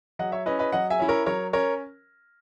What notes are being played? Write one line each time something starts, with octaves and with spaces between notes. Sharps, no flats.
F#3 D#5 F#5
C#5 E5
C#4 E4 B4 D#5
B4 D#5
F#3 D#5 F#5
E5 G#5
C#4 E4
A#4 C#5
F#3 A#4 C#5
C#4 A#4 C#5